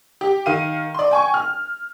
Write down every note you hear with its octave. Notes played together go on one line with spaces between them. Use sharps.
G4
D#3 F5 D#7
D5 C6
G5 G#5 C#6
F6